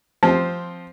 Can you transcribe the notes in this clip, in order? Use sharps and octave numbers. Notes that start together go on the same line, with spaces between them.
F3 C4